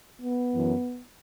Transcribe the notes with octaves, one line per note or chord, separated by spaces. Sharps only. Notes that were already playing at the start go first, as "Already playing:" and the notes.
B3
F#2 E3